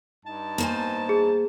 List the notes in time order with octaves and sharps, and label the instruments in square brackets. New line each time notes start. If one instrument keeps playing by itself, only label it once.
[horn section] G2 D#4 A5
[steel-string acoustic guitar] A#3 C5 G#5
[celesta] G#4